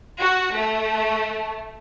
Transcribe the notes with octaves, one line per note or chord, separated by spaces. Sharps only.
F#4
A3